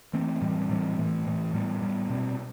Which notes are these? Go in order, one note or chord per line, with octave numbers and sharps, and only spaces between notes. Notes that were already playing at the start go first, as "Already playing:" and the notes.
E3 A3 C4
A2 E3 G3 C4
A2 E3 G3 C4
A2 E3 A3
A2 E3 A3
A2 G3 B3
A2 G3 B3
B2 G3 C4